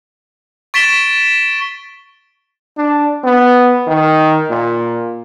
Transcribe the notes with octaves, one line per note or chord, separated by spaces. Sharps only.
C#6 A6 B6 D7 E7 G7
D4
B3
D#3
A#2